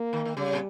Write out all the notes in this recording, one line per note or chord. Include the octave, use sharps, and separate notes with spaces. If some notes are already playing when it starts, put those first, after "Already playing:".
Already playing: A#3
D#3
D#3
C#3 G3
A#2